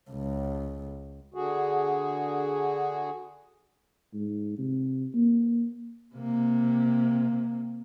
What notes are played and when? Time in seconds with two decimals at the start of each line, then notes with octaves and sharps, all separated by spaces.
0.10 C#2
1.34 D3 F#4 G#4
4.14 G#2
4.58 C3
5.14 A#3
6.14 C3 A#3